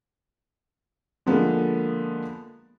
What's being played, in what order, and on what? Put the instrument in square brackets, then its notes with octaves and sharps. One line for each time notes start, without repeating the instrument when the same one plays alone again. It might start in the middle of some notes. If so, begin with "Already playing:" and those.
[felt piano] D3 F3 G#3 A#3 B3